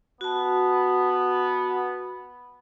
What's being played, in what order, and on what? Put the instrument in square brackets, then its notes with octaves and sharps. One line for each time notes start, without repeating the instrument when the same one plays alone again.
[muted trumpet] B3 [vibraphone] F#4 A5